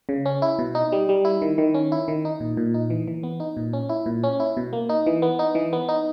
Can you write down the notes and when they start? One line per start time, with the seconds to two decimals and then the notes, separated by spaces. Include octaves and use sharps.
0.09 C#3
0.26 C#4
0.42 E4
0.59 B2
0.75 D#4
0.92 G3
1.09 G3
1.25 E4
1.42 D#3
1.58 D#3
1.74 C#4
1.92 E4
2.08 D#3
2.25 D#4
2.40 A#2
2.57 A#2
2.74 D#4
2.90 E3
3.08 E3
3.23 B3
3.40 D#4
3.57 A#2
3.73 C#4
3.89 E4
4.06 A#2
4.24 C#4
4.40 E4
4.57 B2
4.73 A#3
4.89 D#4
5.07 E3
5.22 B3
5.39 D#4
5.55 E3
5.73 B3
5.89 D#4